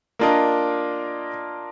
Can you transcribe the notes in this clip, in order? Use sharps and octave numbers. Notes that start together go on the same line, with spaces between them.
A#3 D4 F4 A#4 D#5